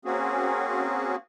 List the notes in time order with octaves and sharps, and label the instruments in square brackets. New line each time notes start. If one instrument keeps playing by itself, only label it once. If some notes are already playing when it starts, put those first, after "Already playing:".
[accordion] A#3 C4 C#4 F#4 G#4